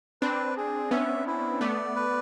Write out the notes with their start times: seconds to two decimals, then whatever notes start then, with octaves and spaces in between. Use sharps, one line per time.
0.22 C4 D4 B4
0.57 G#4
0.91 B3 C#4 E5
1.27 E4
1.61 A3 B3 D5
1.96 B4